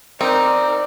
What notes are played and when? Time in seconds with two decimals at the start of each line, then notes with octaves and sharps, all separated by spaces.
0.21 C4 D#4 A#4 D5